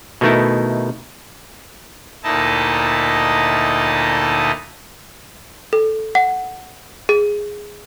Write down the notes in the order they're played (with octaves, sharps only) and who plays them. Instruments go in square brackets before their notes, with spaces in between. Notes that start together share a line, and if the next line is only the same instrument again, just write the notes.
[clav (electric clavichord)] B2 D#3 A3 D#4 E4
[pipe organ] D2 A#2 D#4 E4 D#5 A5
[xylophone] A4
F#5
G#4